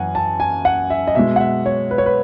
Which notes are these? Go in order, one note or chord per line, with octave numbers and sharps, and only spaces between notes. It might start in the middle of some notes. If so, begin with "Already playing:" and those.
Already playing: F#2 E3 F#5 G#5
A5
G#5
F#5
E5
D#5
B2 G#3 E5
F#5
E5
C#5
B4
C#5
B4